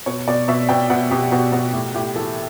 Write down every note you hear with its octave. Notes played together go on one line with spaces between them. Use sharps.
B2 C#5
B2 D5
B2 E5
B2 G5
B2 F#5
B2 G4
B2 F#4
B2 F#4
A2 G4
A2 G4
E3 A4